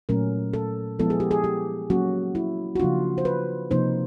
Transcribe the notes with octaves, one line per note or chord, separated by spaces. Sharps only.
A#2 F#3 A3 C#4 A#4
A4
F3 G#3 B3 E4 A4
G#4
G4
G#4
G4
F#3 A#3 C#4 F#4
E4
F#4
C#3 F3 A#3 D4 F4
C5
B4
C3 F3 A#3 D#4 C5